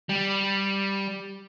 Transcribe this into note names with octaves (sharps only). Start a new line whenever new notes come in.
G3